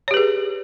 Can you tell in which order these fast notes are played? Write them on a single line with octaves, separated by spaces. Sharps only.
C#5 G4 B4 G#4